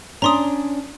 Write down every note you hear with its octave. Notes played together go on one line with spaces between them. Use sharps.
C#4 D4 A#5 C6 D#6